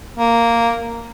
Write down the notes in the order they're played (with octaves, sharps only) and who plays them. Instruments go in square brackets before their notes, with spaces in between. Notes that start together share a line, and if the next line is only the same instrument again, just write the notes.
[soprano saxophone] A#3